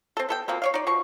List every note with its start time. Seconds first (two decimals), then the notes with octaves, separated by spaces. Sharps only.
0.17 C4 A4
0.29 B3 A4 G5
0.48 B2 F3 A#3 C4
0.62 C#5 D5 F5
0.74 D#4 D5
0.87 B2 F3 C#6